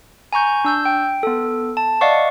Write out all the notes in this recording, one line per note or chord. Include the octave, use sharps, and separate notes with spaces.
G#5 A#5 C#6 G6
D4 E6 G6
G5
B3 A4
A5
D5 D#5 F5 F#5 C#6